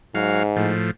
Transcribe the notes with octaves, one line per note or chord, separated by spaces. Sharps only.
G#2 F#3 F5
A2 F3